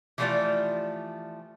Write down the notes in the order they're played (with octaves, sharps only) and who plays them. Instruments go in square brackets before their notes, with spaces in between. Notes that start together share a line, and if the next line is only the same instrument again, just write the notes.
[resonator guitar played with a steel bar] E3 F3 G3 A3 F4 D5